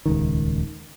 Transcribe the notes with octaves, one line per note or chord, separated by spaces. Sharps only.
D#1 C#2 D#3